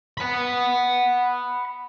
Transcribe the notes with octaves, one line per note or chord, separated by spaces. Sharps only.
F#5 B5